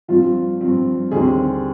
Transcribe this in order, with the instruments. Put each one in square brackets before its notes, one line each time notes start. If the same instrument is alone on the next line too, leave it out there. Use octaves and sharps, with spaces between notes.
[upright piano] G2 F3 C4 F4
G2 F3 C4
D#2 D3 G3 C4 G#4